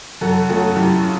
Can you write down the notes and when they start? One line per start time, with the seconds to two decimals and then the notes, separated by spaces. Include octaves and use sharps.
0.21 F#2 F#4 A4
0.49 C#3 F#3 A3 F#4 A4
0.76 F#2 E4 G4
1.03 C#3